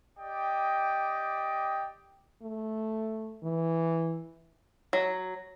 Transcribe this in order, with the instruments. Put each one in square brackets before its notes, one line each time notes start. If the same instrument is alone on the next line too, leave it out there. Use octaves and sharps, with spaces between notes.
[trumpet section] G4 D5 D#5 G5
[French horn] A3
E3
[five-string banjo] F#3